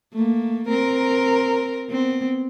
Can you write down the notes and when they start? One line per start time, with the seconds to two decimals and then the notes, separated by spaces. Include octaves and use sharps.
0.13 A3 A#3
0.69 C4 A#4
1.90 B3 C4